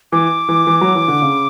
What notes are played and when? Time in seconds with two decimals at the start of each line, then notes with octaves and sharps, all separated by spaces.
0.12 E3 D6
0.49 E3
0.67 E3
0.81 F#3
0.95 E3
1.08 D3
1.22 C#3